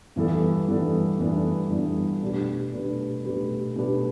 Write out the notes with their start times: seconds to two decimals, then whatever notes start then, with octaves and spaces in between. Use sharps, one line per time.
0.16 G2 E3 B3 D4 A4
0.68 G2 E3 B3 D4 A4
1.19 G2 E3 B3 D4 A4
1.70 G2 E3 B3 D4 A4
2.22 B2 A3 D4 G4 B4
2.74 B2 A3 D4 G4 B4
3.25 B2 A3 D4 G4 B4
3.76 B2 A3 D4 G4 B4